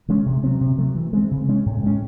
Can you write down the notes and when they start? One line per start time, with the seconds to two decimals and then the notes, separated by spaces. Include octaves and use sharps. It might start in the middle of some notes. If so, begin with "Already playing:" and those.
0.08 E3 G#3 C#4
0.26 C3
0.44 F#3 C4
0.61 C3
0.78 F#3 A3
0.95 E3
1.13 G#3 C4
1.31 C#3
1.49 G#3 C#4
1.66 A2
1.83 G#3 C#4